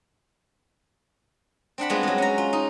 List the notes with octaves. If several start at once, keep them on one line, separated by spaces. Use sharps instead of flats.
C4 D4 F#5 B5
G3 G#3 B3 C4 F4
F#3 G#3
C#4 A#5
F4
D#4